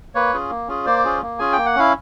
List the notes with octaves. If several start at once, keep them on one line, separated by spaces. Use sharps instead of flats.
A#3 B4 C#5
C#4 F4 G#4
A#3
C#4 F4 G#4
A#3 C5 D5
C#4 F4 G#4
A#3
C#4 F4 G#4 G#5
G5
A#3
F#5
C#4 E4 F5